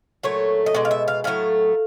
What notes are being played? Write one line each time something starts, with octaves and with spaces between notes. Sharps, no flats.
A#2 F#3 A3 C#5
D#5
B2 G#3 D5
F5
E5
F5
A2 F#3 A3 F5